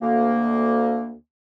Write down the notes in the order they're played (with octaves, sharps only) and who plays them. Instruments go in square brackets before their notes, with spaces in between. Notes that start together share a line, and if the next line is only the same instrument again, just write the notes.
[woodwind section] D2 A#3